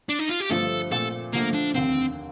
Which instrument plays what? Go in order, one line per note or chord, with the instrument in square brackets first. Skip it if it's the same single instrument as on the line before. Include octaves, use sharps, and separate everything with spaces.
[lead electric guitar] D4
D#4
F4
G4
[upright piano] G1 G2 F3 A3 [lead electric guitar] A4
[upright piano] A#2 A3 C4 [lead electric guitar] A4
[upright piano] D3 F3 A3 [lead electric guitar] A#3
[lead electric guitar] D4
[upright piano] F1 D#2 D3 [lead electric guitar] C4